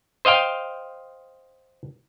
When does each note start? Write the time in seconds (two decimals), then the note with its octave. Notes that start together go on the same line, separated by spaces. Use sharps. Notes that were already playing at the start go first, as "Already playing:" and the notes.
0.25 C5 D#5 F5 G5